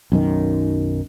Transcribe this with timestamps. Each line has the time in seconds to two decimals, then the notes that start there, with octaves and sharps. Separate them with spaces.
0.12 B1 F#2 D#3